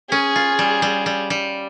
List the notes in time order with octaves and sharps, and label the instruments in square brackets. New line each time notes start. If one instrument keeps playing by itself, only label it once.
[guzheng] C#4 [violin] G#4
[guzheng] F4
G3
G3
G3
G3